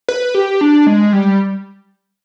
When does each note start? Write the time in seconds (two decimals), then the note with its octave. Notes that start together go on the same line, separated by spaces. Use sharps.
0.09 B4
0.35 G4
0.61 D4
0.87 G#3
1.13 G3